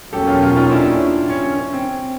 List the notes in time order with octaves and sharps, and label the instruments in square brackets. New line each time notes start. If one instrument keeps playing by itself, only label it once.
[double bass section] E2 B2 F#3 A#3 C#4 [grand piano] G4 A4
[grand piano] F4 G4
F4 G4
D#4 F4
D4 E4
C#4
C#4
C#4
C4